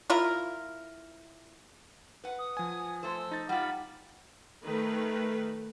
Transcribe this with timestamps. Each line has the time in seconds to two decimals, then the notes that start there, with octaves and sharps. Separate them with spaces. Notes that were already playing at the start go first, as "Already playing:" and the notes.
0.10 E4 F4 A#4
2.24 B4 F#5
2.39 D#6
2.57 F3 G#5
3.03 A3 C5 E6
3.31 D#4 A6
3.49 G3 F4 F#5 B5
4.64 D#3 A3 B4